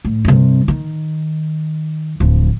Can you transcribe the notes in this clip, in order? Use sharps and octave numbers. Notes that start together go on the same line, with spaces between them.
A2
G2 C3
D#3
D1 F3